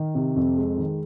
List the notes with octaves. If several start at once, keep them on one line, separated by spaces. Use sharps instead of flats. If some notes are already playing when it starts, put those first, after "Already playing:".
Already playing: D#3
C3
F2
G#3
D#3